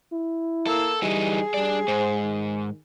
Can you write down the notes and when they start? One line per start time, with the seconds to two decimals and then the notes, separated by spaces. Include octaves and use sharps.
0.12 E4
0.67 A#3 A4 E6
1.02 E3 G3 D#4 G#4
1.54 G3 D4 D5
1.88 G#2 C5
2.24 D#3